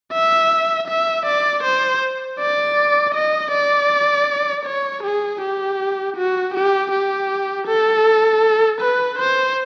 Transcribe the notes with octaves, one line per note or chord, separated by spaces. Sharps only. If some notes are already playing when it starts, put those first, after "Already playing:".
E5
E5
D5
C5
D5
D#5
D5
C#5
G#4
G4
F#4
G4
G4
A4
B4
C5